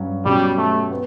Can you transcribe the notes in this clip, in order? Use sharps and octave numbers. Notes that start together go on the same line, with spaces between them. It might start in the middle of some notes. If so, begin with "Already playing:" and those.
Already playing: G2 F#3 C#4 F#4
B2 F#3 G3 C#4 G4
A3
B3